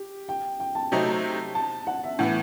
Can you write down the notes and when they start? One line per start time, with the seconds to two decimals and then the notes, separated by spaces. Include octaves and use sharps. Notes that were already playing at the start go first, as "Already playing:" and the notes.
Already playing: G4
0.29 G5
0.60 G5
0.75 A5
0.92 C3 F#3 A3 D#4
1.55 A5
1.87 F#5
2.04 E5
2.19 A2 E3 B3 F#5